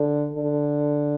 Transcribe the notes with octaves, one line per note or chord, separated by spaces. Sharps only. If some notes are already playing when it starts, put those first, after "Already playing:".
Already playing: D3
D3